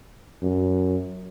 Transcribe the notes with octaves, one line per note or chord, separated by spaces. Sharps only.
F#2